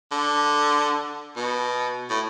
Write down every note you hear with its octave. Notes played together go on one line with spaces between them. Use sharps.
D3
B2
A2